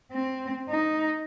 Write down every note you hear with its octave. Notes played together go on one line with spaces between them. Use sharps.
C4
D#4